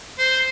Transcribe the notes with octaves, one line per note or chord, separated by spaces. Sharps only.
C5